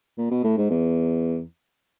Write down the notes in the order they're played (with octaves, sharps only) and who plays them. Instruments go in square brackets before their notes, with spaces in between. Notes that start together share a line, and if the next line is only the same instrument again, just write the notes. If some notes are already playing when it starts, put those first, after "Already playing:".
[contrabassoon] A#2
B2
A2
G#2
E2